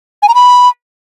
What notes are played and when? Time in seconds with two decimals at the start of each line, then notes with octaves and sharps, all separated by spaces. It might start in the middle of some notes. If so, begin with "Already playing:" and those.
0.23 G#5
0.29 A#5
0.35 B5